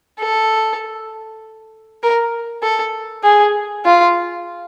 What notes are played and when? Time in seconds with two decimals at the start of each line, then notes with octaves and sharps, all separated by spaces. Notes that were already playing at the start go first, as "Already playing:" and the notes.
0.20 A4
2.03 A#4
2.63 A4
3.24 G#4
3.85 F4